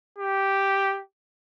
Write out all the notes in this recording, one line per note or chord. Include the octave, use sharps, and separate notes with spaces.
G4